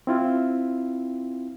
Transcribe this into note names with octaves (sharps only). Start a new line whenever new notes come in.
C4 E4 F4